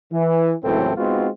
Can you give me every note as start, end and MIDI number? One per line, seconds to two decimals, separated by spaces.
0.13 0.53 52
0.64 0.92 37
0.64 0.92 45
0.64 0.92 52
0.64 0.92 54
0.64 0.92 60
0.64 0.92 69
0.97 1.28 56
0.97 1.28 59
0.97 1.28 60
0.97 1.28 63
0.97 1.28 65
0.97 1.28 66